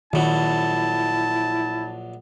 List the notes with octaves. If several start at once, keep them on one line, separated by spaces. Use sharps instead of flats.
A#1 D#3 F#3 E4 A5